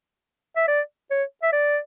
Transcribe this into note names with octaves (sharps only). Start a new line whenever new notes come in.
E5
D5
C#5
E5
D5